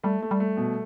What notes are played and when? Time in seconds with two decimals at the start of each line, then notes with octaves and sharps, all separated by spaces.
0.04 G3 A3
0.22 A3
0.31 G3
0.40 A3
0.57 B2